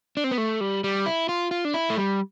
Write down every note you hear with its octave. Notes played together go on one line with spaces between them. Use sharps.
D4
C4
B3
A3
G3
G3
E4
F4
F4
D4
E4
A3
G3